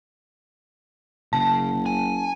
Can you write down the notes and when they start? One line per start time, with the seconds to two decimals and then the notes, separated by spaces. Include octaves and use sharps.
1.33 F#1 C#3 A5
1.86 G#5